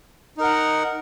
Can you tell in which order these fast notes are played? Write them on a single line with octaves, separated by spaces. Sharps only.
D#4 A#4 F#5